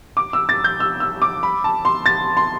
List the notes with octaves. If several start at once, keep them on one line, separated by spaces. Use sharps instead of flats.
D6
E6
A6
G6
E6
E6
D6
B5
A5
C6
A6
C6